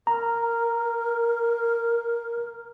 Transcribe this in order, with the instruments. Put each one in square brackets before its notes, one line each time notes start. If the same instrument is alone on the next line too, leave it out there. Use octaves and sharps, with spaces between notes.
[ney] A#4 [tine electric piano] A#5